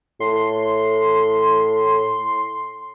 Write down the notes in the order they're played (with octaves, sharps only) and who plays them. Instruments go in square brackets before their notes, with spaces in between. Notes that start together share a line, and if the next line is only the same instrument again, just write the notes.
[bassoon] A2 [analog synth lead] C6